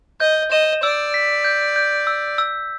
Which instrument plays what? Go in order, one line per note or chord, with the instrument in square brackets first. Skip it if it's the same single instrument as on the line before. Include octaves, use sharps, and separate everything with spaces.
[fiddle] D#5 [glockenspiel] G6
[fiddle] D#5 [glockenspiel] E7
[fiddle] D5 [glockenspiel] E6
[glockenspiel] B6
G6
G6
E6
E6